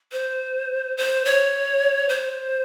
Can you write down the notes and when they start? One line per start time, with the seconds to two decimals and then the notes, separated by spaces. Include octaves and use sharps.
0.12 C5
0.97 C5
1.25 C#5
2.09 C5